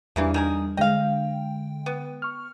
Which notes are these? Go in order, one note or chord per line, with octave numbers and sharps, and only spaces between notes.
E2 C#3 E3 G3 A#3 D4
D#3 G#4 A#4
D3 G#3 D#5 F5 G5
B3
C#6 F6